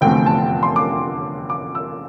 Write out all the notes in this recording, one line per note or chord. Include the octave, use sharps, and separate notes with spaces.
F1 E2 D3 A3 C4 G5
A5
C6
D6
D6
E6